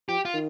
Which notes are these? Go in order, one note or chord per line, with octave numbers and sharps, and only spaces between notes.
F3 G4
F4
D#3